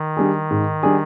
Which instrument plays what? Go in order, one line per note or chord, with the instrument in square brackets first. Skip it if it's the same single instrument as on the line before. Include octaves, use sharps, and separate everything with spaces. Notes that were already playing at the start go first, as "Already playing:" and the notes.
Already playing: [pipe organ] D#3
[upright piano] G3 D4 G#4
G#2
G3 D4 G#4